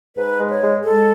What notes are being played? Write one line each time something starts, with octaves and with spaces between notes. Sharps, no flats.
G#2 B4
G#3
C#5
G#3
G#3 A4